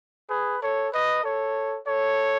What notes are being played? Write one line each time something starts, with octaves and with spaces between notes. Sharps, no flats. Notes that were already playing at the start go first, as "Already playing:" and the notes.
G#4 B4
A4 C#5
B4 D#5
A4 C#5
A4 C#5